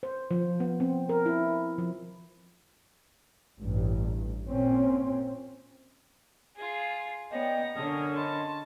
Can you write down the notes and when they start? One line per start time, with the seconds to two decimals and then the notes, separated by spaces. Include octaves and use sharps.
0.03 C5
0.31 F3
0.60 B3
0.80 C4
1.09 A#4
1.26 E4
1.78 F3
3.60 A1 G2
4.49 A#2 C4 C#4
6.56 F4 G#4
7.32 B3 C#4 D5 D#5 G5 A#5
7.76 F#2 D3 C#4 A5 D#6
8.16 D#5 A5 B5 C6